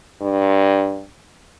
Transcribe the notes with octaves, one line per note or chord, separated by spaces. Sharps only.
G2